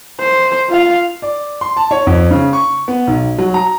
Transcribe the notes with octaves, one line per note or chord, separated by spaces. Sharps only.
C5
F4 F5
D5
C6
A5
C#5
F2
C#3
C#6
B3
B1
F#3
A#5